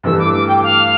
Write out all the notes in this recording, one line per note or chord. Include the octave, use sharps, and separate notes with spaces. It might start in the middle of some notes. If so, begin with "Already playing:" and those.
G2 E3 A3 E6
D6
D6
G5
F5